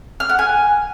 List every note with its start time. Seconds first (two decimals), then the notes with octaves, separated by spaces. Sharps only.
0.20 F6
0.29 F#5
0.39 G#5